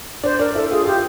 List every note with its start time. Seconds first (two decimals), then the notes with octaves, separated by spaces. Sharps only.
0.24 D4 C5
0.39 D4 A#4
0.55 E4 A4
0.71 F4 G#4
0.86 F4 G4